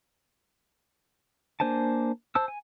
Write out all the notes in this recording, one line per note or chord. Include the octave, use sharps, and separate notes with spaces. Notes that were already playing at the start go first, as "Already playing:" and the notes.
A#3 D4 C5 G#5 A5
C5 A5 E6
G#5